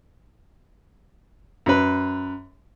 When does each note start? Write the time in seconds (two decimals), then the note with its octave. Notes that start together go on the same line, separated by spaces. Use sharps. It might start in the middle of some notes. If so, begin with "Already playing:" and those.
1.66 F#2 B4